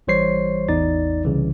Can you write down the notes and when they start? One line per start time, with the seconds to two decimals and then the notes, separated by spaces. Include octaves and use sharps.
0.07 A1 E3 G3 C5 C#5 C7
0.69 A1 E2 D#4 D5 A6
1.25 C2 C#3 E3